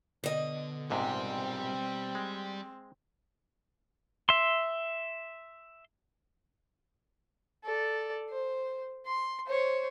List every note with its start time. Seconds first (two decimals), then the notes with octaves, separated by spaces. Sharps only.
0.24 B2 D3 D#5
0.90 A#1 G#2 C3 G3 C4 G5
2.15 G#3
4.29 E5 C6
7.64 A4 D5
8.29 C5
9.06 C6
9.47 C5 C#5